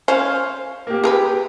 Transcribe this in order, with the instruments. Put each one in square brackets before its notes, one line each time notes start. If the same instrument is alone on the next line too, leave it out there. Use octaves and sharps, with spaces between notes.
[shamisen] C#4 [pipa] C5 F5
[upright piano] A#3 G4
[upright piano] G4 [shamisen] G#4 A#4 B4